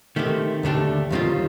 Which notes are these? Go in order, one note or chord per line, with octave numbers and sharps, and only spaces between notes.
D#3 A3 C4 G4
D#2 D3 A3 D4 G4
D#2 D#3 G3 C4 F4